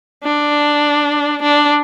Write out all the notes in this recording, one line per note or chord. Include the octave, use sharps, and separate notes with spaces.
D4
D4